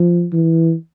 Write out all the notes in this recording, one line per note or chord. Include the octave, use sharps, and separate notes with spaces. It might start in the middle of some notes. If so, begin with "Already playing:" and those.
Already playing: F3
E3